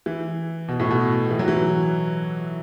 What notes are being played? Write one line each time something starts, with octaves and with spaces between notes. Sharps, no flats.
E3
B2
A2
B2
E3
F#3
E3